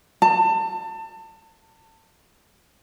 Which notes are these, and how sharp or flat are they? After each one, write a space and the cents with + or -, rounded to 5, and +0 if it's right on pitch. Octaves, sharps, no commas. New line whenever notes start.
A5 +30